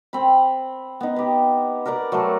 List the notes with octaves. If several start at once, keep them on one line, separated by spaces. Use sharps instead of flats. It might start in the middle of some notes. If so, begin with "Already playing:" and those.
C4 B5
B3 D#4
G4 B4
A#4 B4 D5 A#5
F#3 A3 A4 A#4